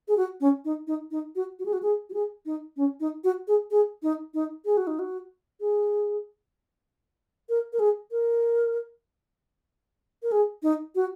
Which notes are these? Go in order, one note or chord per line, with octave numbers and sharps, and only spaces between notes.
G#4
F#4
C#4
D#4
D#4
D#4
F#4
F#4
G#4
F#4
G#4
F#4
G#4
D#4
C#4
D#4
F#4
G#4
G#4
D#4
D#4
G#4
F#4
D#4
F#4
G#4
A#4
A#4
G#4
A#4
A#4
G#4
D#4
F#4